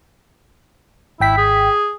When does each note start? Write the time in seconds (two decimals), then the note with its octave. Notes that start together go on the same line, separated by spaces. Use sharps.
1.20 G#1 E4 G5 B6
1.37 G#4